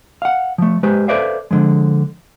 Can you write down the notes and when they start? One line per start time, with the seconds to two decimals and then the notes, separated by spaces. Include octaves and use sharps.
0.22 F5 F#5
0.58 F3 A3
0.83 G#3 G4 B4 C5
1.08 A4 B4 C5 D5 E5 F5
1.51 D3 F3 G#3